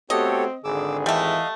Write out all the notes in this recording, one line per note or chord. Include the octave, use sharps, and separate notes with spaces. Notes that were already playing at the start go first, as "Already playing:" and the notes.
A3 B3 C4 F#4 G4 A4 C#5 D#5
G#1 D3 G#4 D6 E6
E3 G3 A3 D#5 F5